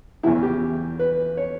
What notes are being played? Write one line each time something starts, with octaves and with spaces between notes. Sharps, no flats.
E2 C#3 E3 E4
G4
B4
C#5